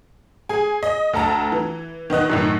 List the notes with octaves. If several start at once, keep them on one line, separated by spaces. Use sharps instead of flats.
G#4 G#5
D#5
D2 A4 A5 A#5
E3
D#3 B3 D#5 F#6
F#2 A2 D#3